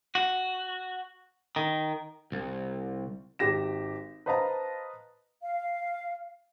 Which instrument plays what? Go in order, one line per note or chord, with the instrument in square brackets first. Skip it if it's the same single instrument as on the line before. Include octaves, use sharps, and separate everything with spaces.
[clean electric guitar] F#4
D#3
[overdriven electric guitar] C2
[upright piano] G#1 G4 A#6 E7
B4 C5 D#5 F5 A5 A#5
[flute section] F5